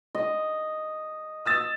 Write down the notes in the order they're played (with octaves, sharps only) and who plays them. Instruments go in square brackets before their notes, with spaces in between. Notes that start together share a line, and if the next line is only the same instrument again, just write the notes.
[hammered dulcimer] D#5
[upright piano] D#6 E6 A6